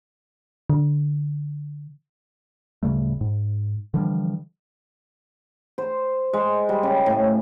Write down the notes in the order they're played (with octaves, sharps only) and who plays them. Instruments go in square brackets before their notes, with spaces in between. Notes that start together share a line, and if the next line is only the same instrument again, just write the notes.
[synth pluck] D3
[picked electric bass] D1 C#3 G3 A3
G#2
D3 E3 F3 G3
[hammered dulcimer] C5
G#3
G3
C#3
A2